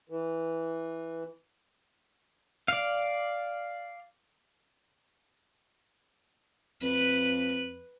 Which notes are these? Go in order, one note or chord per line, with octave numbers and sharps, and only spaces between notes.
E3
D5 F5
F2 B4